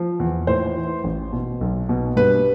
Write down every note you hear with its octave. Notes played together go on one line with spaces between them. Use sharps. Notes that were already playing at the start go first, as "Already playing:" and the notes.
Already playing: F3
E2
A2 C5
E3
A1
B2
B1
B2
G2 B4